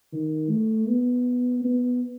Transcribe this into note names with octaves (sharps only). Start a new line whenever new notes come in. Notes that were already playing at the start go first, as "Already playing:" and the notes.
D#3
A3
B3
B3